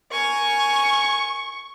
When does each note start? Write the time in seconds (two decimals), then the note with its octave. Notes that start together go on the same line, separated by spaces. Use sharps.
0.12 A#4 G#5 C#6